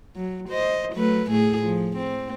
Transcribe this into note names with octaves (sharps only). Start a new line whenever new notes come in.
F#3
C5 D#5
F#3 A3 B4
A2 A3 G#4
F3
C4